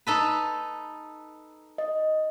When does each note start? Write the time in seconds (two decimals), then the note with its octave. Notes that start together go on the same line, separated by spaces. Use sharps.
0.07 D#4 A4 B4
1.78 D#5